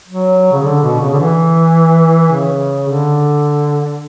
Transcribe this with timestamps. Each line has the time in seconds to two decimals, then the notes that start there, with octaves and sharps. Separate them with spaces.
0.07 F#3
0.52 C#3
0.63 D3
0.83 B2
1.00 C#3
1.13 D3
1.20 E3
2.32 C#3
2.88 D3